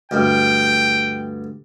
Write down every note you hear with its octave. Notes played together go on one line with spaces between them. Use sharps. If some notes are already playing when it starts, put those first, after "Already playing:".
D2 G2 G5